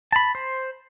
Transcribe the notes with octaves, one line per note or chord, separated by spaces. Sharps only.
A5 B5
C5